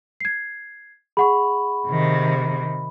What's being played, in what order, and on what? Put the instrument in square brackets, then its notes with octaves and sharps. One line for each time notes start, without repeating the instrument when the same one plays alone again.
[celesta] G#6 C7
[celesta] G#4 F#5 C#6 [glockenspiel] B5
[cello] C3 D#3